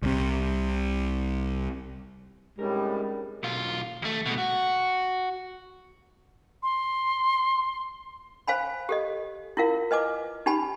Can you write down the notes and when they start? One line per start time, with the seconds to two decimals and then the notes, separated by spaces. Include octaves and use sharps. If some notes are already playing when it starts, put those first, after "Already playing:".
0.02 C2 C3
2.59 A2 G3 G#3 C4 C#4 D#4 G4 A#4
3.43 B1 F4
4.02 D#2 A3
4.26 B2 G#3
4.38 F#4
6.63 C6
8.48 C5 F5 G#5 B5
8.89 G4 A4 D#5
9.57 E4 F4 A#4 F5
9.91 B4 D#5 G#5 D6
10.46 D#4 G4 G#5 A5 B5